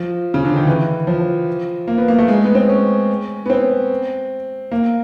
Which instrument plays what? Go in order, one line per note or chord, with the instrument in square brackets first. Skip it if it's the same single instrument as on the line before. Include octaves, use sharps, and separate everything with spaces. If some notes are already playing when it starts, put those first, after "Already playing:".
Already playing: [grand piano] F3
C#3
D3
D#3
E3
F3
A#3
B3
A#3
A3
G#3
B3
C4
C#4
B3
C4
A#3